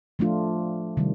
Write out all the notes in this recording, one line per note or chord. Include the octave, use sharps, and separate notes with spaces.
F3 A3 D4 F4
C3 D#3 G3